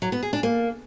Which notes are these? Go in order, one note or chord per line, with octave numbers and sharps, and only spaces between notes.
F#3
B3
G#4
D4
A#3